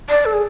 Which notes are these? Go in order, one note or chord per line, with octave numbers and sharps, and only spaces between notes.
D5
A4
G#4